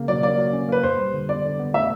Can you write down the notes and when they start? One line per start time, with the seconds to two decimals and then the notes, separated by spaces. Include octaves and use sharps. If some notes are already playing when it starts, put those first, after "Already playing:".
Already playing: C#3 A#3
0.08 F#3 D5
0.23 A#3 D5
0.38 F#3
0.53 C#4
0.69 A#3 B4
0.83 F2 C5
0.98 G3
1.14 D3
1.29 B3 D5
1.45 D3
1.59 B3
1.74 A3 E5